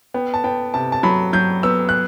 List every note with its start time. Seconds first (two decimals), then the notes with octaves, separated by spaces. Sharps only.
0.14 B3 G5
0.34 A5
0.44 B3 G5
0.74 C3 A5
0.92 A5
1.03 F#3 B5
1.33 F#3 G6
1.63 B3 E6
1.89 F#6